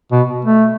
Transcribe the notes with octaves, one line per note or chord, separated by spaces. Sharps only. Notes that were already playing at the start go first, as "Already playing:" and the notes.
B2
A3